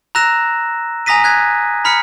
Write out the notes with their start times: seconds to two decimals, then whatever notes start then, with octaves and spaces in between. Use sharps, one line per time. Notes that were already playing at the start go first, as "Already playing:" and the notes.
0.15 A#5 E6 F#6 A#6 E7
1.06 G#5 A#5 D#6 A#6 B6 D#7
1.24 F#6 G#6 B6
1.85 A#5 B5 F6 B6 C#7